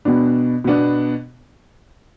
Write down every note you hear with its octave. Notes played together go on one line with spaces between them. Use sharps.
B2 B3 D4
B2 B3 D4